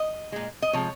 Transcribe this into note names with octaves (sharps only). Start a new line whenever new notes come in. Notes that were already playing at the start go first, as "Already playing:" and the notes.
Already playing: D#5
A#2 G#3
D#5
C3 F3 G#3 C#5